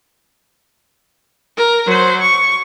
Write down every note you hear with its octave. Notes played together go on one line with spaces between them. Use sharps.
A#4
F#3 C5
C#6